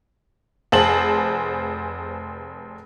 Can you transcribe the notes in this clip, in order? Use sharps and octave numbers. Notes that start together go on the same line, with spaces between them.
F1 G#4 C5 A5 F#7